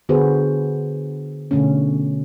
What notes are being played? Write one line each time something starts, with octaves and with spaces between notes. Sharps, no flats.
D3 B3 F#4 G#4 B4 C5
B2 D3 A3 C#4